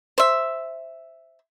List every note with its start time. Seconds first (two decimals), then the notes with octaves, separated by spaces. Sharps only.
0.18 C5 E5